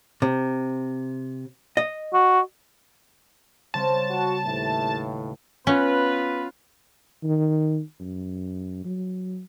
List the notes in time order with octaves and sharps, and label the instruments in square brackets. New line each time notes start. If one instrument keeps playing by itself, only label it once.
[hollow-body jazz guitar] C3
D#5
[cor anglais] F#4
[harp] C#3 G3 C4 [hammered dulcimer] C5 C#5 F5 [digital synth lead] A5
[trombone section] F#4
[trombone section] D#2 A2 [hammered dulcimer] B4 E5 G5
[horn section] B3 F4 B4 [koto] C#4
[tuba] D#3
F#2
F#3